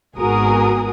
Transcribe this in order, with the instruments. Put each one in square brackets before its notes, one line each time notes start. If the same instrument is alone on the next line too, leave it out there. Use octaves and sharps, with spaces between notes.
[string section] G#1 B3 F#4 G#4 A#4 D#6